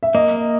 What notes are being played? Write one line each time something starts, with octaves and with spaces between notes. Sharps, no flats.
E5
A#3 D#5